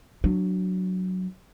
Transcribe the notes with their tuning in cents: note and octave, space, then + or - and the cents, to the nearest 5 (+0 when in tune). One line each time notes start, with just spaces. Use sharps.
F#3 +0 D4 +0